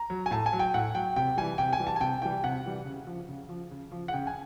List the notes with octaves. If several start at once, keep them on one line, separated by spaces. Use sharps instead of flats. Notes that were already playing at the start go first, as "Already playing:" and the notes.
Already playing: A#5
F#3
G#5
A2 A5
G#5
F#3
G5
A2 F#5
F#3 G5
C3 G5
E3 G3 G#5
C3 G5
G#5
E3 G3
A5
G#5
C3 G5
E3 G3 G5
C3 F#5
E3 G3
C#3
F3
C#3
F3
C#3
F3
F#5
C#3 G5
G#5